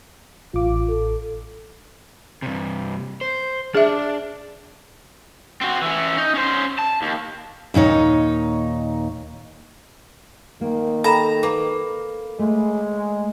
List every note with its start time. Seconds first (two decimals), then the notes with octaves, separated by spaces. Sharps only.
0.54 A1 F4 D6
0.88 A4
2.42 G2 C3
3.21 C5
3.75 D4 G#4 E5
5.61 C4 F#4
5.82 E3 C#4
6.18 D#4
6.35 C#4 C5
6.79 A5
7.02 D#2
7.74 D#2 A#2 D#4 C#5
10.61 D#3 A#3
11.04 A4 A#5 B5 E7
11.43 A#3 B4
12.39 G#3 A3